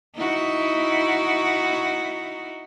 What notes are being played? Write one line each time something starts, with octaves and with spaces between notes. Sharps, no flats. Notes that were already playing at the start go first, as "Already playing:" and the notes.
D#4 E4 F#4